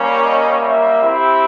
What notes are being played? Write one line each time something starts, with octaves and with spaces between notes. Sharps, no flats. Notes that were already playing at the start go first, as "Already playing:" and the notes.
Already playing: G3 A#3 C#4
D#5
E5
C4 E4 G4